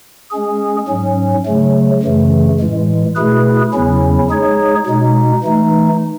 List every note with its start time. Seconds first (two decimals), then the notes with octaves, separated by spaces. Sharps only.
0.31 G#3 C#4 G#4
0.89 G#2 F#3 C#4
1.46 C#3 F#3 A3
2.02 F#2 C#3 E3 A3
2.60 A2 E3 G#3
3.15 B2 A3 E4 G#4 B4
3.73 E2 C#3 F#3 C#4 E4
4.30 G#3 D#4 G#4 C#5
4.87 B2 G#3 D#4
5.43 E3 A3 D#4